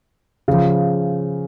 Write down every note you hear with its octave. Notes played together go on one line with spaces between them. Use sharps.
C#3 F3